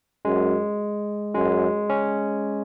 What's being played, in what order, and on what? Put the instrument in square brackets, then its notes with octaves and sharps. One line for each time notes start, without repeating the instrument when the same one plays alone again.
[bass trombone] F#2 [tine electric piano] G#3
[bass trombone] F#2 [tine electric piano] G#3
[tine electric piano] C#4